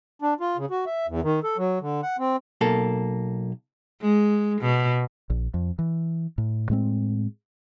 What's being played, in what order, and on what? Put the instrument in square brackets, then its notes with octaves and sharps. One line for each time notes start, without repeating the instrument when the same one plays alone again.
[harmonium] D4
F4
C#3
F#4
E5
E2
D#3
A4
F#3
D3
F#5
C4
[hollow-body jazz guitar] B1 A#3 A4
[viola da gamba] G#3
B2
[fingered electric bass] A#1
F2
E3
A2
A2 G#3 C4